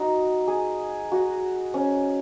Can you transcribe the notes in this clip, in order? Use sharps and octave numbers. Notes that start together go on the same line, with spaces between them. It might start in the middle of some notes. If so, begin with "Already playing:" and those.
Already playing: D#4 F#4
G#4
F#4
C#4